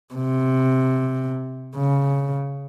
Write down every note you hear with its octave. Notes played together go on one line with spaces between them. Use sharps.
C3
C#3